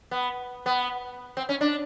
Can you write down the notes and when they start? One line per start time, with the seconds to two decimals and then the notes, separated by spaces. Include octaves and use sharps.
0.11 B3
0.66 B3
1.37 C4
1.49 C#4
1.61 D4